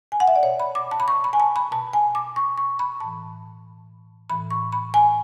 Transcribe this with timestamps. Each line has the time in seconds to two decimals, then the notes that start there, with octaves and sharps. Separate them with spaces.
0.12 G#5
0.20 F#5
0.28 E5
0.36 D5
0.43 B2 C#5
0.60 B5
0.75 D6
0.91 A5
1.00 B5
1.08 C#6
1.24 B5
1.33 G#5
1.40 A5
1.56 B5
1.72 B2 A5
1.93 G#5
2.15 D6
2.36 C#6
2.58 C#6
2.79 B5
3.00 A2 E3 A5
4.30 A2 E3 B5
4.51 C#6
4.72 B5
4.94 G#5